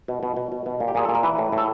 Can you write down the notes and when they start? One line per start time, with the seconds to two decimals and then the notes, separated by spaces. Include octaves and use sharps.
0.08 B2
0.23 B2
0.37 B2
0.52 B2
0.66 B2
0.80 A#2
0.88 G4
0.95 A#2 G#4
1.05 A#2 A4
1.15 A#4
1.23 E3 B4
1.38 A2
1.52 A2
1.58 A4